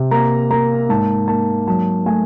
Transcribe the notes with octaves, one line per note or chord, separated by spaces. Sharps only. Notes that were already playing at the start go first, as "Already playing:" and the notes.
Already playing: C3
A#3 A#5
A#3 A#5
G#2 A5
A#3 A5
F#3 A5
A3 G#5